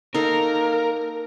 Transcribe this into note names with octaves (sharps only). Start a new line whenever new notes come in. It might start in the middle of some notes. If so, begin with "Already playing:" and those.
A#3 D#4 A4 A#4 F5